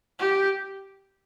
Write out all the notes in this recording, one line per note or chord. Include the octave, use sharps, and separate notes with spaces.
G4